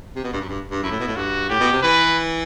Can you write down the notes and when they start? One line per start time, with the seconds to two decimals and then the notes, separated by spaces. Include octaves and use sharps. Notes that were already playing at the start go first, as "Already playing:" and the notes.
0.15 C3
0.24 B2
0.33 G2
0.41 F#2
0.49 G2
0.71 G2
0.82 F#2 E4
0.91 A2
1.00 B2
1.07 A2
1.16 G2 F#4
1.49 A2 G4
1.60 B2
1.72 C3
1.82 E3 B4